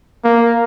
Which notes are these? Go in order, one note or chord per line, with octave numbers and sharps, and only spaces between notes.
A#3